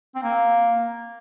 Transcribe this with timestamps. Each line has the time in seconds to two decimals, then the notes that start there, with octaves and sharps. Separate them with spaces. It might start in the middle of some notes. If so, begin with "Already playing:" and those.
0.15 C4
0.23 A#3